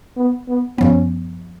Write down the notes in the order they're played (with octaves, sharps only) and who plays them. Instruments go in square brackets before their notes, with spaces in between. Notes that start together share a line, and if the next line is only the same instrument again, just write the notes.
[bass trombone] B3
B3
[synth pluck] F#2 F3 B3 [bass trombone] C#4